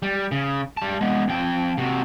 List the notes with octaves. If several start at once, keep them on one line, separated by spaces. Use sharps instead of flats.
G3
C#3
G3 A5
G#3 B3
F2 G5
C3 F#4